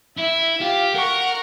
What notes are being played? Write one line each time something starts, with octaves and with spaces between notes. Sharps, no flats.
E4 E5
F4 G4
A#4 F#5 C#6